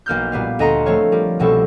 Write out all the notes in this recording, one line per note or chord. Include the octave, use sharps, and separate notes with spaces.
B1 A#3 F6 G6
A#2 G3 B3 F5
D2 D#5 A#5 C6 C#7
F3 A3 C4 C#5 F5
G3 F4 A#4
C2 B2 F3 C4 A4 C#6